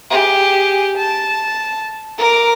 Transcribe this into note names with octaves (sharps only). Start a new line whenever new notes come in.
G4 G#4
A5
A#4 D6